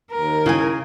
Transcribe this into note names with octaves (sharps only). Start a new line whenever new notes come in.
D#2 A#4
C#3 E4 F5 G#5